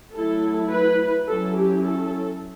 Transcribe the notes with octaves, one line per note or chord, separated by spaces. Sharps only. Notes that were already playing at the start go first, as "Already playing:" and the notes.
F#3 A3 E4 A4
B4
F#3 C#4 E4 A4
G4
A4